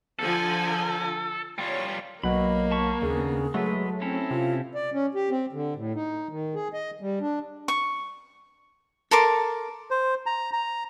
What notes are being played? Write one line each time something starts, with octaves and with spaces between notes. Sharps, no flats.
D3 F3 A4 G#5
G3 F4 C#5
B1 F#3 A#3 D#5 B5
A5 B5 C#6
D#2 C#3 B3 D4 G#4
F#3 G#3 A3 B4
C4 C#4 E4 A4
C3 F4
D5
C#4
G4
C4
D3
A2
D#4
D#3
G#4
D#5
G3
D4
C#6
A4 A#4 C6 D6
C5
A#5
A#5